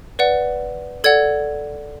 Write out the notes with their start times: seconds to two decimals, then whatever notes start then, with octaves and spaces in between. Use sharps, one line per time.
0.19 B4 D5 F#5
1.04 A4 D5 F#5 G#6